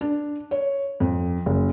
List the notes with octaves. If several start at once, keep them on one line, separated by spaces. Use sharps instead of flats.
D4
C#5
F2
F#1